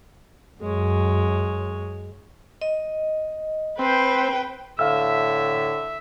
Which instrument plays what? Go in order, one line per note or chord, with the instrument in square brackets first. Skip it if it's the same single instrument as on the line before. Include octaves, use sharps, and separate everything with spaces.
[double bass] F#2 [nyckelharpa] G#3 C#5
[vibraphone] D#5
[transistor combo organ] C4 [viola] B4 G5 [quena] C5
[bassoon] A2 [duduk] D3 [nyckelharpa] E5 [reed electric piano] F5 E6